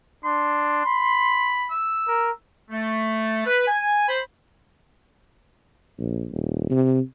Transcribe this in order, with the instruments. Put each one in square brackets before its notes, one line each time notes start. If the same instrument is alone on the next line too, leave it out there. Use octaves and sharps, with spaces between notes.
[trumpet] D4 [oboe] C6
[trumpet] B5
[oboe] E6
[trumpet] A#4
[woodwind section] A3
B4
G#5
C5 B5
[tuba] A#1
D#1
C3